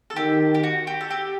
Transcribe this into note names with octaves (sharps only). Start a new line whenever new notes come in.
A4
D#3 G4
G4
F#4
G4
A4
G4